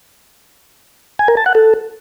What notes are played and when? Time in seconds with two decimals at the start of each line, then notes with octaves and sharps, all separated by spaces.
1.19 G#5
1.28 A#4
1.37 A5
1.46 F#5
1.55 A4